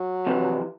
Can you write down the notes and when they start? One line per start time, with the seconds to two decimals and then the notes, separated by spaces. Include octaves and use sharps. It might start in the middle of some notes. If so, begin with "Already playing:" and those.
Already playing: F#3
0.27 F2 C3 E3